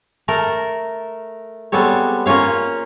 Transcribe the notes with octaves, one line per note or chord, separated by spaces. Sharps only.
A3 A4 A#4
G3 G#3 B3 C4 A4 C#5
A#3 C#4 F4 C#5 F5